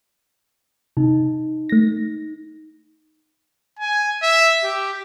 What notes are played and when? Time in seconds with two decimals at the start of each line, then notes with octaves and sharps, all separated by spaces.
0.97 C3 D#4
1.69 A3 A#6
3.79 G#5
4.23 E5
4.64 G4